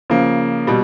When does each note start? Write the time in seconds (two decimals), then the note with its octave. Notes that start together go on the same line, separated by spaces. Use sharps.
0.10 C#3 F3 A#3
0.67 B2 G3